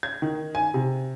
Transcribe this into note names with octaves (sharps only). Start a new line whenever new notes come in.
G#6
D#3
G#5
C3